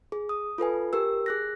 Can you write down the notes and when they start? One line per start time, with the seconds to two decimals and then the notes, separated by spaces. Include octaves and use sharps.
0.12 G#4
0.29 D#6
0.58 F4 A4 B4 G#5
0.93 G4 A#4 E6
1.26 G#4 F#6 A#6